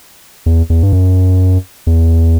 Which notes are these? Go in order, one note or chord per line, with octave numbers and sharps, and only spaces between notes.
E2
E2
G2
F#2
E2